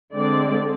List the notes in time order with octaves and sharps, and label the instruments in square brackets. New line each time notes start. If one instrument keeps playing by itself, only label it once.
[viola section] D3 G#3 C4 D5